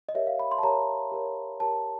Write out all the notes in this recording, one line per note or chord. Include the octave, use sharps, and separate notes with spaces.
D#5
G4 A#4 C#5 E5
F5
B5
C6
A5
G4 A#4 C#5 A#5
G4 A#4 C#5
G4 A#4 C#5 A5